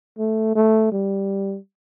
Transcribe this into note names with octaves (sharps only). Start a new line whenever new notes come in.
A3
A3
G3